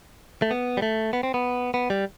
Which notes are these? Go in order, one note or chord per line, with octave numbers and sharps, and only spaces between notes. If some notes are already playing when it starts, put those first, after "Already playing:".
A3
B3
G3
A3
B3
C4
B3
B3
G3